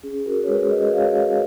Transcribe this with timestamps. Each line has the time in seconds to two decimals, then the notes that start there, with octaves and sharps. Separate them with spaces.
0.03 C#4 G#4
0.26 F#4 A#4
0.43 C#5
0.48 G#3 G#4 B4
0.71 B4 D#5
0.92 F#4 C#5 F5